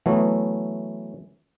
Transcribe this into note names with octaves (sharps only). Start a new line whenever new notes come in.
E3 F#3 A3 B3